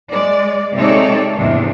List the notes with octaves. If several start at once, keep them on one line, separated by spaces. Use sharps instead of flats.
G#3 D5
C3 G#3 D#4 A4 C#5 D5
E2 G#2 C3 D4